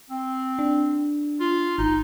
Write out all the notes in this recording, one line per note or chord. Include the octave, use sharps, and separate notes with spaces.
C4
D4
F4
G#1 D#4